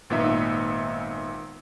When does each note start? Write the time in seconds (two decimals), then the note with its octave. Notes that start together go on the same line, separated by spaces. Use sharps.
0.10 G#1 A#2 B3 D#4 E5